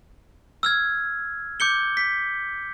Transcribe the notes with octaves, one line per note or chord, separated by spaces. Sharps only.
E6 F6 G#6
D6 G6 C#7 G7
B6